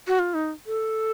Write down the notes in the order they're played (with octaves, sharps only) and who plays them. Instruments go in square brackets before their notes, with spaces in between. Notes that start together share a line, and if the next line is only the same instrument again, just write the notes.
[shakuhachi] F#4
F4
D#4
A4